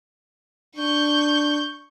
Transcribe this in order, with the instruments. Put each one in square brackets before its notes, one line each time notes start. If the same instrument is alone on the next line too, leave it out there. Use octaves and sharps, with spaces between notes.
[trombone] D4 [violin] C#6 G6